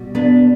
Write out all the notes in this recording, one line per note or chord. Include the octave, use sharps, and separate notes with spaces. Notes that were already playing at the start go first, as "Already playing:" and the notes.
Already playing: B2 G3
B3 D4